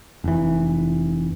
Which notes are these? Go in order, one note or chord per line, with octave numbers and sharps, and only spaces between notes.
F1 E3